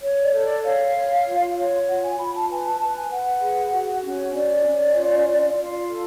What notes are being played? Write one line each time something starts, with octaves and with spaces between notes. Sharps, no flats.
C#5
D5
A4
D5
C#5 F5
C#5
F4
C#5
F4 F#5
G#5
F4 B5
A5
B4 G#5
A5
B4 A5
G#5
B4 F#5
G#4
F#4
C#4
C#4 D5
C#4
F4
F4
F4
A4